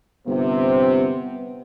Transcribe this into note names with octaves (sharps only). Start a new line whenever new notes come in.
G1 C3 B3 C4